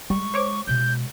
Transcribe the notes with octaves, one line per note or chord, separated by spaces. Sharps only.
G3 G#3 C#6
C5 C#5 D6
B2 G#3 G6